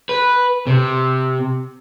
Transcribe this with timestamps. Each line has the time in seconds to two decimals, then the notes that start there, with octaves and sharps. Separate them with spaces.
0.09 B4
0.67 C3